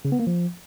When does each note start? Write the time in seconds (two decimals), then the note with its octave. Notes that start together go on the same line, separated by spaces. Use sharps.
0.05 C#3
0.12 B3
0.19 A#3
0.27 F3